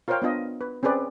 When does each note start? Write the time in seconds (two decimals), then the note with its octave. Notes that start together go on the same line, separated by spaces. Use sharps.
0.08 F4 A#4 C5 C#5 F5 G5
0.22 B3 D4 F4 D#5
0.61 B4
0.83 C4 C#4 G#4 B4 D5